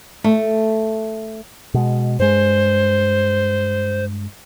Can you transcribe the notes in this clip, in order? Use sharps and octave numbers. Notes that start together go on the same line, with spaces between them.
A3
B2 G#3
G2 G#3 C5